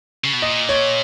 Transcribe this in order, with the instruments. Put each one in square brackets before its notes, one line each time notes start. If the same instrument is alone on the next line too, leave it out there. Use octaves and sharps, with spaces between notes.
[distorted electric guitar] C#3
B2
[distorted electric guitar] A#2 [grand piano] D#5
[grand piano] C#5